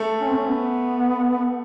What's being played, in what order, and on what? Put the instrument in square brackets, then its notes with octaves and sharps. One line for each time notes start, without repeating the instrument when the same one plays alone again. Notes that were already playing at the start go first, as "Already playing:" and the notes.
Already playing: [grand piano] A3
[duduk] C#4
C4
C#4
B3